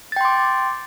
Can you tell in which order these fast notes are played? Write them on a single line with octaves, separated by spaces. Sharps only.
A6 G5 C6 D6